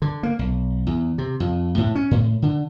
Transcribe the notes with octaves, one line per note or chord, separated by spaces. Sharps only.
D3
A#3
B1
E2
C3
F2
A2
C#4
A2
D3